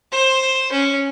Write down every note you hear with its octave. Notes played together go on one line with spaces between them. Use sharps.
C5
C#4